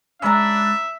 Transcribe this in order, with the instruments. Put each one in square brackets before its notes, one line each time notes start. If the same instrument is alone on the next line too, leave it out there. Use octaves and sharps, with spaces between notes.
[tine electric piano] G#3 B5 E6 [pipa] C#4 A#5 [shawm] D4 [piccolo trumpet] E5